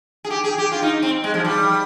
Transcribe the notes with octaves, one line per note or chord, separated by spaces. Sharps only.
G#4
G4
G#4
G4
F4
D#4
C4
G#3
F3
G3